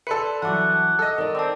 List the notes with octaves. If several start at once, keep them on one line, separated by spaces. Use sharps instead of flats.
A4 B4 D5 C6 C#7
E3 F#3 F#5 A5 D6
A4 D#5
D#3 A#4 D5
C4 A5 D6